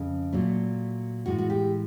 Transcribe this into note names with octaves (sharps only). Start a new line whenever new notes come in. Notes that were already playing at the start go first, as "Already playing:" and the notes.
Already playing: F2 C#3
A#2 F#3 A3
A2 E3 G#3 F#4
F#4
G4